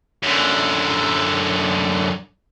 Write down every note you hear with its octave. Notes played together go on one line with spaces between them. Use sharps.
F#2 D3